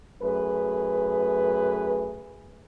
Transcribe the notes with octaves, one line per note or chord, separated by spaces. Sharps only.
F#2 A3 G#4 B4